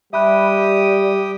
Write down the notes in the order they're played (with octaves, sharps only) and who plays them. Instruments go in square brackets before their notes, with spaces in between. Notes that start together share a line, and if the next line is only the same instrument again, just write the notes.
[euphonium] G3 [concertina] G4 D#6 [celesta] E5 B5 F#6